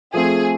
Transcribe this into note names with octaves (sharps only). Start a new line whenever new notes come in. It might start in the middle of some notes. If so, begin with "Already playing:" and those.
F3 A3 C4 G#4